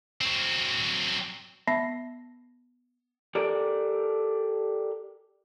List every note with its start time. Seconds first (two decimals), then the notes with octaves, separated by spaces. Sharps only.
0.21 F#3 C4
1.67 B3 E5 A5 B5 A#6 C7
3.35 G4 A4 A#4 D5